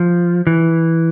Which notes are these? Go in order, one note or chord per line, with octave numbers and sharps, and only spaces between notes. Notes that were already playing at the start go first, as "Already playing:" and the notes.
Already playing: F3
E3